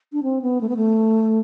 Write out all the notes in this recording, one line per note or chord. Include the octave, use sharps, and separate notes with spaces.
D4
C4
B3
A3
B3
A3